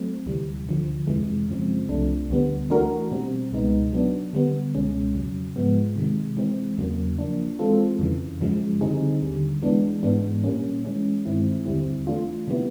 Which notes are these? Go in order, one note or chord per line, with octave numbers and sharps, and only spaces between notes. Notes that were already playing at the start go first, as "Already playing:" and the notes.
Already playing: F#3 A3 C4
D2 C3 E3 G3
D2 D3 F3
F2 C3 E3 G#3
F#2 C#3 F3 G#3 C4
C2 C3 F3 A3 D4
D2 D3 G3 B3
E3 A3 D4 F#4 A#4
B2 G3 C4
C#2 B2 G#3 B3 D#4
F#3 B3 D4
D3 G3 B3
C#2 B2 G#3 C#4
F2 C#3 F#3
G#2 F3 G#3 B3
C3 D#3 G#3
E3 G#3 C4
E2 C#3 F#3 A#3
F3 A#3 D4
E3 G#3 C4 F4 A4
F2 C#3 E3
F#2 C#3 F3 G#3
D3 G3 C4 D#4 G#4
D#2 D3 G3
E3 G#3 B3 D4
G#2 E3 G#3 B3 D4
A#2 G3 A#3 C#4
E3 G#3 C#4
G2 D#3 G#3 C4 E4
D#2 D3 G3 C4 E4
E3 A3 D4 F4
C3 E3 G3 B3 E4